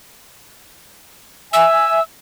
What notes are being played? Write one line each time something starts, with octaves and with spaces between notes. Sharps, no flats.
E5 G#5 E6